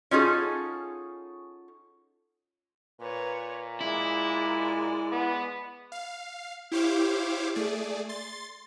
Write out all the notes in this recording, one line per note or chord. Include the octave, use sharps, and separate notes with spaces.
C#4 D#4 F4 F#4 G#4 A4
A#2 B4 C#5
G#3 E4 D5
B3
F5
E4 G4 C5 C#5 F5 D6
A3 G#4 D5
C6 A6